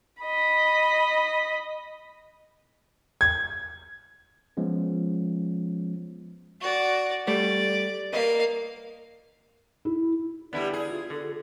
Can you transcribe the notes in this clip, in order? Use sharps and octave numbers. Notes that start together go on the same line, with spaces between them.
D#5 B5
G#6
F3 G#3 B3 C#4
F#4 D5
G3 A3 D5
A#3 B4 D#5 F5
E4
D3 G3 B3 E4 B4 D5
G#4
F4
D3 A4